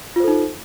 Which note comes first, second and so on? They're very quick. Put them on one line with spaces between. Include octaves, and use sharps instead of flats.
F4 C5 A4 D#4